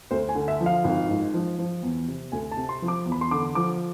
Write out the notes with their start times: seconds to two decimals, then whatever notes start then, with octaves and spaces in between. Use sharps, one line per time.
0.11 D2 C5
0.29 G#5
0.35 D3
0.48 E5
0.61 F3
0.66 F5
0.84 G#1
1.09 G#2
1.34 F3
1.59 F3
1.83 E2
2.08 C3
2.32 D2 G#5
2.51 A5
2.57 C3
2.69 C6
2.82 F3
2.88 D6
3.06 E2
3.12 B5
3.21 C6
3.31 D3 D6
3.55 F3 D6